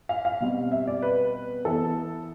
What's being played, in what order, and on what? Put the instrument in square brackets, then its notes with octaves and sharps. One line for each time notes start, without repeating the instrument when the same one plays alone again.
[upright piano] F5
F5
B2 G3 C4
E5
D5
B4
E3 B3 A4